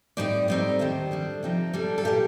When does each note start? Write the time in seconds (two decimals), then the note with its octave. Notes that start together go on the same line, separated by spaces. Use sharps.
0.17 A2 G3 C4 D#4 D5
0.48 A2 G3 C4 D#4 D5
0.79 D#2 D#3 A3 C5
1.11 D3 G3 D4
1.43 C3 F3 C4 D#4
1.73 A#2 G3 D4 A4
1.98 A4
2.05 A#2 G3 A#3 G4